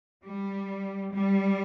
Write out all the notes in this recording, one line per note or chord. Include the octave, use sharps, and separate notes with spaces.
G3
G3